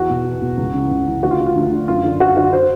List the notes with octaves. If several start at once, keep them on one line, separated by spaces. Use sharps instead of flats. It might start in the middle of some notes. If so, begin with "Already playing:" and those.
Already playing: E2 F#4
B2
E2
B2
C#2
C#3 E3
C#2
C#3 E3
D2 F#4
F4
D3
F4
D2
D3
F#2 F4
D3
F#2 F#4
D3 F#4
C5